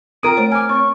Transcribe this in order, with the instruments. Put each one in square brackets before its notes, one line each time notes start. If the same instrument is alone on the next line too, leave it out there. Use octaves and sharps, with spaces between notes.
[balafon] C4 F4 G5 [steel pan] A#4 D#6 [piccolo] D7
[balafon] A3 C5 C#5
[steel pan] G#5 D6 [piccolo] F6
[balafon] C4 C#5 [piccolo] C#6